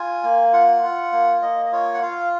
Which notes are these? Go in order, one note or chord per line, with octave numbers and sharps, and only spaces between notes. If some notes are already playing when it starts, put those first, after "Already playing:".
Already playing: F4 G#5
A#3
F4 F#5
F4
A#3
A#3 D#5
D#5
F4 C#5
F#5
F4 F5